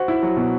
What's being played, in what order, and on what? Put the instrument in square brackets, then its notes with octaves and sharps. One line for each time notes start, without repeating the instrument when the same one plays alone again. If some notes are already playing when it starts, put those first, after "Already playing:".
Already playing: [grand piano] F#4 [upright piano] C5
[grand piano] E4
F#3
B2